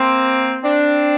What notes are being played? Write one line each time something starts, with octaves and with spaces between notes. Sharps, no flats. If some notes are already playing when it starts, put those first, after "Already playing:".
Already playing: A#3 C4
C4 D4